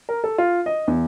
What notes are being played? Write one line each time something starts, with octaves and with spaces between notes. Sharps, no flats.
A#4
A4
F4
D#5
E2